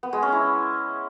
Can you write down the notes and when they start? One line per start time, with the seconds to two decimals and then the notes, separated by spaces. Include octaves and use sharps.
0.03 B3
0.13 G#3
0.23 C#4
0.32 E4